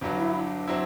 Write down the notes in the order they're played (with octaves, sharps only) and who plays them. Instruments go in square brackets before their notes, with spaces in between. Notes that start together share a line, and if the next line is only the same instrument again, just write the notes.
[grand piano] G1 G2 F#3 [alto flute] D4
[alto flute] E4
D4
[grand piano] F#3 C4 E4